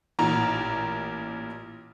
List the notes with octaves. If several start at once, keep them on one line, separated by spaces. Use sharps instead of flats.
A1 A#2 A#5